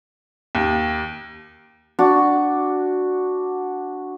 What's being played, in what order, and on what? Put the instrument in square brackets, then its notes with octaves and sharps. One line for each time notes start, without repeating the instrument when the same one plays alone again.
[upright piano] D#2
[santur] D4 F#4